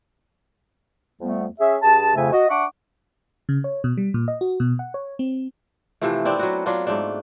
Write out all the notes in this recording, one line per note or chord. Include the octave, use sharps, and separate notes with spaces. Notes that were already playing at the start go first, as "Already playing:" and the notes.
F2 G3 A3 B3
C#4 G#4 E5
G2 G#4 A5
F2 C#3 A3 E5 G#5
F#4 D#5
D4 E5 F#5 C#6 D6
C#3
C#5
B2
G3
A#2
D#5
F#4
B2
F#5
C#5
C4
C3 E3 F3 A3
B3 C4 D4 E4
F#3 F#4
F#3 D4 F4
G#2 A3 D4